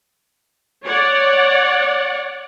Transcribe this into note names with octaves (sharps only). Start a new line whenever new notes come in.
C#5 D5 F#5